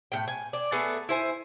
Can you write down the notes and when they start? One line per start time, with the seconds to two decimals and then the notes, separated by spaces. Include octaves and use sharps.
0.12 A2 C3 G5
0.28 G#5
0.53 D4
0.72 A3 B3 G#4 A4
1.09 E4 C5 G#5